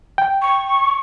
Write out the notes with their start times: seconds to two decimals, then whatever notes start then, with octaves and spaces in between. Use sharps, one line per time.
0.18 G5
0.42 C#6